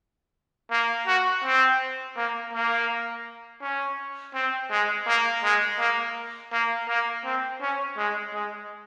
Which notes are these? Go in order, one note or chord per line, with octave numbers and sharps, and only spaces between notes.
A#3
F#4
C4
A#3
A#3
C#4
C4
G#3
A#3
G#3
A#3
A#3
A#3
C4
C#4
G#3
G#3